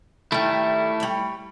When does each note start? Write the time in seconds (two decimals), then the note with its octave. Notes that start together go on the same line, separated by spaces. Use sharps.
0.32 D#3 G3 A3 E4
1.00 G3 C#5